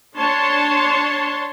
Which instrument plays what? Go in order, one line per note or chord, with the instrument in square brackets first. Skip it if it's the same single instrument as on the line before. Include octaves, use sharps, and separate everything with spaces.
[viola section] D4 C#5 A5 C6